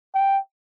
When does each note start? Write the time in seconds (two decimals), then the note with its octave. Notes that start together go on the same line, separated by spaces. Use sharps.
0.15 G5